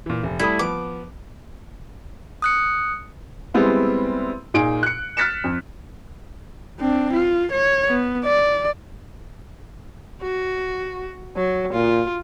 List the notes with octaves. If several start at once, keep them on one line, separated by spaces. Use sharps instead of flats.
A#2 E3
F1
G3 A3 E4 D#6
F3 B3 D6
D#6 F#6 C#7
G3 G#3 B3 C4 E4
A#2 D#4 G#4 D7
F#6 C#7
F6 F#6 A6 B6 C#7 E7
F2
C4 D4
F4
C#5
B3
D5
F#4
F#3
A#2 F4